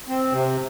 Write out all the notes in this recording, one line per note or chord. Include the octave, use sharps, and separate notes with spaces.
C4
C3